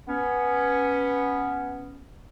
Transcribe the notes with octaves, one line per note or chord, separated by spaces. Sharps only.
B3 C#4